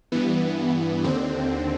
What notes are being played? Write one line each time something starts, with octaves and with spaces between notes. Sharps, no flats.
G2 E3 B3
D#2 D3 C4